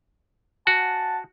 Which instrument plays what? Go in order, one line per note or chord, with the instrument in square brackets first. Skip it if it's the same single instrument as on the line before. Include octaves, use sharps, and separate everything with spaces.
[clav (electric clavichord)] F#4 [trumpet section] F#5 G#5 A5